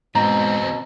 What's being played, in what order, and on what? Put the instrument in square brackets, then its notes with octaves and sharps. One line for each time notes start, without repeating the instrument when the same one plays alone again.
[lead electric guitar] E2 C4 [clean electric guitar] G#2 [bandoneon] B2 [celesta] A#5